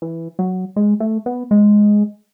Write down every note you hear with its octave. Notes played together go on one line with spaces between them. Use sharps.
E3
F#3
G#3
A3
B3
G#3